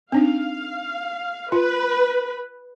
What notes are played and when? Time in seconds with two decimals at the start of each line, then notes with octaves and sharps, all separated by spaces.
0.12 C4 D4 D#4 F5
1.52 F4 B4